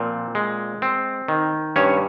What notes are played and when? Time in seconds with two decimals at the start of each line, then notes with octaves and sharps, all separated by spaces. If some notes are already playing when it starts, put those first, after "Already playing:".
Already playing: A#2 F3 C4
0.35 G#3
0.82 C4
1.28 D#3
1.76 G2 C#4 C#5